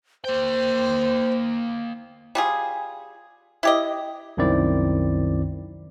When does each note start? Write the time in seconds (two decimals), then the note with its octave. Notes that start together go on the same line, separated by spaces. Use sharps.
0.24 A#3 C5 G5
2.35 G3 F4 G#4
3.63 E4 G4 D#5
4.37 C2 F#2 D#3 C4 E4 D5